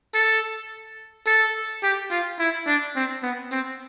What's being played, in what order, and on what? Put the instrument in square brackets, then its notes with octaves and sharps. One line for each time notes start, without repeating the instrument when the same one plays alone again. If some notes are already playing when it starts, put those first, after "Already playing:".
[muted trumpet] A4
A4
G4
F4
E4
D4
C4
B3
C4